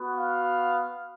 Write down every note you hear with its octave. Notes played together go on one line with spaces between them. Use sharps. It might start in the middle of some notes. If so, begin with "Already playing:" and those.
Already playing: B3 F#4
F5